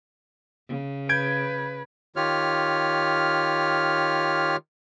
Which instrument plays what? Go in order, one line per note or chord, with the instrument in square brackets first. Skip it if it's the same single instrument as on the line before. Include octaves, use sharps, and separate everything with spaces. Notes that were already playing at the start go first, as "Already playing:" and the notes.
[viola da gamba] C#3
[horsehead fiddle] B4 [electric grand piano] G6 G#6 D7
[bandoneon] D#3 F4 G4 C#5 F6